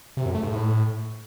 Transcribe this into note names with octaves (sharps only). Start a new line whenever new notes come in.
C3
F#2
A3
G#2
A2